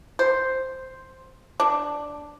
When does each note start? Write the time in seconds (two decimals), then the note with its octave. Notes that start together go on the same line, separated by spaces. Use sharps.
0.19 C5
1.60 D4